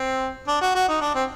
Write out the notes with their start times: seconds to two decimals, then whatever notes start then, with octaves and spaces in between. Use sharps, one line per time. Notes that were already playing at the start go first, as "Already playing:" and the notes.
Already playing: C4
0.48 D4
0.61 F#4
0.75 F#4
0.88 D#4
1.01 D4
1.14 C4